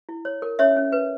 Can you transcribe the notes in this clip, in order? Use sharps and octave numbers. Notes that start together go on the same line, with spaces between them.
E4
C#5
A#4
C#4 C#5 E5
C#4
B4